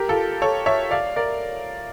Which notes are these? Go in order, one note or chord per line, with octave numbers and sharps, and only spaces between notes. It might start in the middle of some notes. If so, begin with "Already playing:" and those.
Already playing: G4 A#4
F4 A4
A4 C#5
C#5 E5
D5 F5
A#4 D5